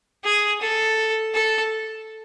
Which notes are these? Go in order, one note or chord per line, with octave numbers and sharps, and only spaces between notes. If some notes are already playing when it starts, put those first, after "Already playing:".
G#4
A4
A4